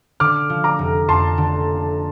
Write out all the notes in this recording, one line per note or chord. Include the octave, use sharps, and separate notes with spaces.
D3 D6 F6
F3
A#5 D6
F1
F2 A5 C6
D3